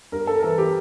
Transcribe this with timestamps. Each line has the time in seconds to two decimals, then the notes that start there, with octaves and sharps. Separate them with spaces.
0.12 G2 A#4
0.27 G2 A4
0.39 A#4
0.43 E3 A4
0.58 E3 G4